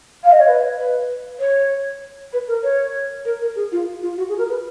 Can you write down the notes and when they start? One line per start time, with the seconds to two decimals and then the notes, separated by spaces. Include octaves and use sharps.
0.23 F5
0.32 D#5
0.40 C#5
0.47 B4
0.78 B4
1.39 C#5
2.33 B4
2.48 A#4
2.63 C#5
3.25 A#4
3.41 A#4
3.55 G#4
3.72 F4
4.02 F4
4.17 F#4
4.28 G#4
4.38 A#4
4.49 B4